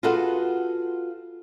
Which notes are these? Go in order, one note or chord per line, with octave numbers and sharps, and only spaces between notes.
F4 F#4 G#4 A4 B4 F#5